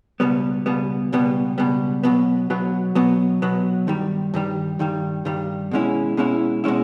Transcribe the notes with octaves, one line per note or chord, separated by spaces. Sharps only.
C#2 B2 G3 B3
C#2 B2 G3 B3
C#2 B2 G3 B3
C#2 B2 G3 B3
B2 F#3 B3
B2 F#3 B3
B2 F#3 B3
B2 F#3 B3
G2 D#3 G3
G2 D#3 G3
G2 D#3 G3
G2 D#3 G3
B2 G#3 C#4 E4
B2 G#3 C#4 E4
B2 G#3 C#4 E4